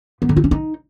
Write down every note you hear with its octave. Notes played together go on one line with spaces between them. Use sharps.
B3
D3
F4
C#4
D#4